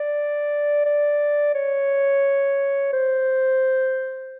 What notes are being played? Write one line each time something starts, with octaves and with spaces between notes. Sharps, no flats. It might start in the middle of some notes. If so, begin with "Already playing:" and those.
Already playing: D5
D5
C#5
C5